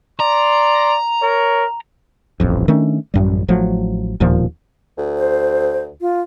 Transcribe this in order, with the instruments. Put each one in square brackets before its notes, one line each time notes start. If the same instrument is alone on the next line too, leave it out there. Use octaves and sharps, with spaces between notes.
[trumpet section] D5 C6 [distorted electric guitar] A#5
[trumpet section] A#4 C#5
[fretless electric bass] D#1 A1 F2
D#3 A3 C#4 D4
A1 F#2 G3
A1 F3 F#3 A3
E1 D#2 A#2 F3
[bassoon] D2
[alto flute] C5
F4